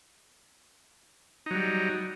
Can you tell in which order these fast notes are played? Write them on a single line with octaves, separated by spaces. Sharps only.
D#4 F#3 G3